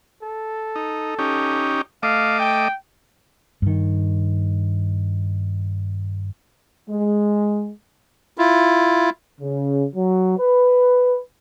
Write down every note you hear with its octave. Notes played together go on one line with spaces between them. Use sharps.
A4
D#4
C#4 D#4 G4
A3 D#5 F5 D6
G5
G2 D#3
G#3
E4 F4
C#3
F#3
B4